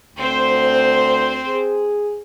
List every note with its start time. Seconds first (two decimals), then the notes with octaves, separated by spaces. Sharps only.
0.16 D2 C4 C5
1.47 G#4